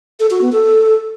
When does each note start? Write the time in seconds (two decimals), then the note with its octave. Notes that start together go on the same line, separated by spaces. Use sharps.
0.20 A4
0.31 F#4
0.41 B3
0.52 A4